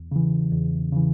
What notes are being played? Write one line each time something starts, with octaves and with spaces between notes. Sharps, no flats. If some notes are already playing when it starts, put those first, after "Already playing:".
Already playing: E2
C#3 E3
E2
C#3 E3